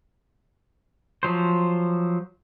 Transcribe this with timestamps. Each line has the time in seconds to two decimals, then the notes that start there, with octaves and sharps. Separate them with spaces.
1.23 F3 F#3 C5